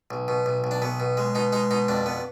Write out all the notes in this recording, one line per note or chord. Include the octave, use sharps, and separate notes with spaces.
B1
B2
B1
B1
D4
B1 B3
B2
G#3
B2 D#4
G#3 D#4
B2 D#4
F2 D4
B3